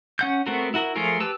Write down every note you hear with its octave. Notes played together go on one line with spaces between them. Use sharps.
C#4 F#5 G6
A3 B3 C4 F#4 A#4
E4 F#4 A#4
F3 A3 F4 G#4 A#4
G4 B4 A5 E6